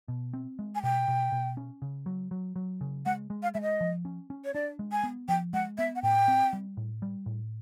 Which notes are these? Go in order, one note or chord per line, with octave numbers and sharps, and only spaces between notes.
B2
C4
G#3
G#5
B2 G5
B2
B2
C#4
C#3
F#3
F#3
F#3
C#3
G#3 F#5
G#3
F5
G#3 E5
D#5
F3
C#4
C#4
C#5
D4 D5
G#3
G#5
B3
F3 G5
G#3 F#5
B3 E5
F#5
A2 G5
C4
G3
A2
G3
A2